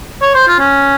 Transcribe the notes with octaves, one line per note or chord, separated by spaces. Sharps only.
C#5
C5
F4
C#4